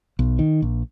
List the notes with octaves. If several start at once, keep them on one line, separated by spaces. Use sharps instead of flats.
B1
D#3
A#1